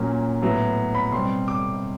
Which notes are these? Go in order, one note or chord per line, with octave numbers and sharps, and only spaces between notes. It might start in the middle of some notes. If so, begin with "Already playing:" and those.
Already playing: A#2 F#3 A#3 C#4
A2 F#3 B3
B5
B2 G3 C4 C6
D6